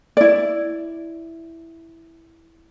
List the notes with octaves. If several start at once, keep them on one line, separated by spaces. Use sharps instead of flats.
E4 D5